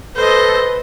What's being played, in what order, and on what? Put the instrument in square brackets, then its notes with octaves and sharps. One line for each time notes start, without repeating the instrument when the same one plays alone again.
[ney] A4 [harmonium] B4 [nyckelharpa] C5 D#5